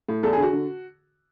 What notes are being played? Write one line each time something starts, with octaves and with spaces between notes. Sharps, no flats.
A2
E2 A4
D3 G#4
F#4
D3